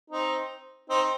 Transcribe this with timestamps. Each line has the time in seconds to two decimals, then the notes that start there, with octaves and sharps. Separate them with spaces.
0.10 C4 D#4
0.89 C4 D#4